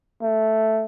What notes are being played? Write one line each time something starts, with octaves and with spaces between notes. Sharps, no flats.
A3